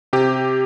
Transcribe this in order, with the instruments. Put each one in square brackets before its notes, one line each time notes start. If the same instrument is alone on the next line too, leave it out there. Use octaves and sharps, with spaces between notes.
[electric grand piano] C3 G4